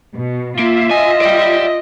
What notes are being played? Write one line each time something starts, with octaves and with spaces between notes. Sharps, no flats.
B2
A#3 F4 E5
D#5 G#5
D5 G5